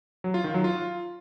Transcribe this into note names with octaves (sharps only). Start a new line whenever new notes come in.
F#3
F4
D#3
F#3
F4